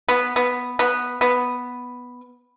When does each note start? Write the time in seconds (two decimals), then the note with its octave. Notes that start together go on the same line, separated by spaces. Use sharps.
0.08 B3
0.36 B3
0.79 B3
1.21 B3